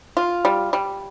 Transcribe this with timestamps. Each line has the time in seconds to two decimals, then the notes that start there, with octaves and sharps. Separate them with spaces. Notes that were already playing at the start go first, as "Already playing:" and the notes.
0.17 F4
0.45 G3
0.73 G3